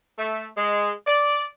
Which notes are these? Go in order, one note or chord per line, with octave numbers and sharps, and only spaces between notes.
A3
G#3
D5